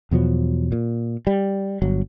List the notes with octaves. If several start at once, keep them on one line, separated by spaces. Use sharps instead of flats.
E2 B2 F3 F#3
A#2
G3
G1 F#3